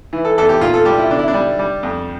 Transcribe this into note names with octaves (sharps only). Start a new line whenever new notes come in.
E3
A4
E2 A4
G4
A#2 F4
A4
G3 G4
E4
D3 D4
E4
D4
G3
G3
F2